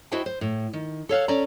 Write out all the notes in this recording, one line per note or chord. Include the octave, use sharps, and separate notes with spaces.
E4 F#4 C5 D#5 G5 A5
C5
A2
D#3
A4 C#5 F5 F#5
C#4 A4 D5 A#5